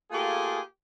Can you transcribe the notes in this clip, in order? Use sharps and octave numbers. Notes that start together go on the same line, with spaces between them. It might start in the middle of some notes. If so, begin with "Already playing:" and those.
A3 A#3 F4 G4 G#4